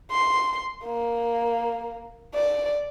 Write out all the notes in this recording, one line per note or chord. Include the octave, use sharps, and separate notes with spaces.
C6
A#3
D5